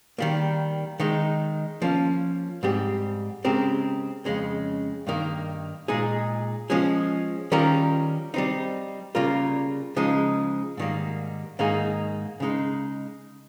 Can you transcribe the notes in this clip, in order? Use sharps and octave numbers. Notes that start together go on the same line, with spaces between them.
D#3 G3 A#3
D#3 G#3 D#4
F3 A#3 C#4
G#2 G3 C4 G4
C#3 G#3 C4 G4 A#4
F2 C#3 G#3 C#4
G2 D#3 A#3
A#2 G#3 D#4 G#4
F3 G#3 C#4 G#4
D#3 G3 C#4 F4 A#4
G3 C4 D#4
C#3 G3 A#3 F4 A#4
C#3 F3 G#3 D#4
G#2 D#3 G3 A#3
G#2 D#3 A#3 D#4 G#4
C#3 G#3 D#4